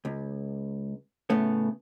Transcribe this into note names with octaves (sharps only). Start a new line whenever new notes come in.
C#2
A2 C#3 A3 B3